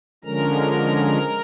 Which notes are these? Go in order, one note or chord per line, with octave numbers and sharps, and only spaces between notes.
D3 F3 G#3 C#4 A#4 A#5